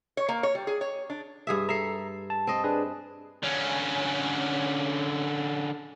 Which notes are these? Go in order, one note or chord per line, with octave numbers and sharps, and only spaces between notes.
C#5
A#3
C#5
G3
G#4
C#5
D4
G2 G#4 E5
A4 E5 A#5 C7
A5
C4 D#5
D4 G#4 B4
D3 C#4